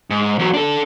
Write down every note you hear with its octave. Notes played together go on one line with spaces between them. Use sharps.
G#2
E2 F#3
D4 A4